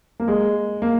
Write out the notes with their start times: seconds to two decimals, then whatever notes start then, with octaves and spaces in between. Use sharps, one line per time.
0.20 A#3
0.28 G#3
0.82 A#3